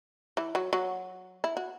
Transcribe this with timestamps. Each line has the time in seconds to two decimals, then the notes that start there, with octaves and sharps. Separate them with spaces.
0.37 E3 E4
0.55 F#3 F#4
0.73 F#3 F#4
1.44 E4
1.57 F#4